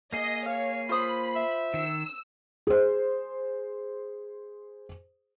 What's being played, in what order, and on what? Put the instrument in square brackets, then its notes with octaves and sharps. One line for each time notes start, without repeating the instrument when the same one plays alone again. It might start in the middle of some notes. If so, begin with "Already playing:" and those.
[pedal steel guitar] A#3 G#4 [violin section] D#5
[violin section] C#5 [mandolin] F5
[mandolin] F4 C5 D#6 [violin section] B5
[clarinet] E5
[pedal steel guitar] D#3 [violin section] E6
[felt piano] G#4 C5